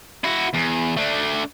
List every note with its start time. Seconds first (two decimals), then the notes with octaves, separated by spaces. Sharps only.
0.24 E4 F#4
0.54 E2
0.97 A3 D4